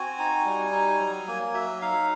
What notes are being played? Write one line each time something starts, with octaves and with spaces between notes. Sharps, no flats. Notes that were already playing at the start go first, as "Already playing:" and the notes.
Already playing: C4 F#4 G#5
D#4
G3
D#4
F#3
A#3
F#3 E5
D#4 F5